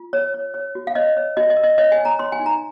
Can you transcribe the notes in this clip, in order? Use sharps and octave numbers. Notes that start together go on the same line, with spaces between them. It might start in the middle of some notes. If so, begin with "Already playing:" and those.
Already playing: F4
C#5
C#5
C#5
F#4
F5
C#5 D#5
C#5
F#4 D#5
D#5
A#4
D#5
C#5 D#5
G#5
C#5
A#5
C#5 C6
G#5
D#4
A#5